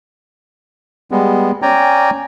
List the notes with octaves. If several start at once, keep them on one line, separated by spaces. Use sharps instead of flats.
G3 G#3 B3
C#4 D5 G5 G#5 A#5